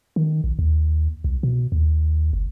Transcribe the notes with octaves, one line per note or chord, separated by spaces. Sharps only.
D#3
A#1
D#2
C2
B2
D#2
F#1